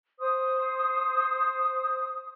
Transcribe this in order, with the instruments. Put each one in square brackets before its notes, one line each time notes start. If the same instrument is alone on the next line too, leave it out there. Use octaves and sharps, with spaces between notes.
[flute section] C5 D#6